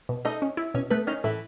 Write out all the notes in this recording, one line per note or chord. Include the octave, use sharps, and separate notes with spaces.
B2
A3 D#4 D#5
C#4
E4
B2 C#4 C#5
A3 B3 B4
D#3 C#4 D#4
A2 E3 E4